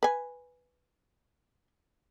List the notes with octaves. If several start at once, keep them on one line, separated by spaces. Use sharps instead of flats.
B4 G#5